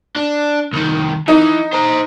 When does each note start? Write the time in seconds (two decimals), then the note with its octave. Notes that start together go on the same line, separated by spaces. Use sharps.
0.16 D4
0.73 C2 D#3
1.28 E3 D#4
1.73 C5 A#5